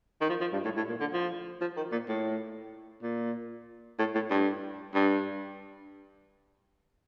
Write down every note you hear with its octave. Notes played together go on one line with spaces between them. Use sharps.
D#3
F3
F3
G2
A2
A2
A#2
D3
F3
F3
D#3
A#2
A2
A#2
A2
A2
G2
G2